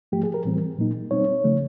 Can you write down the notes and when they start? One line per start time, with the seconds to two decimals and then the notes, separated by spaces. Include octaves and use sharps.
0.12 G#2 F3 A3 G4
0.23 G#4
0.34 A#4
0.45 A2 E3 G3 C4
0.78 A#2 F#3 A#3 D#4
1.11 B2 G3 C4 D#4 C#5
1.44 C#3 F3 A3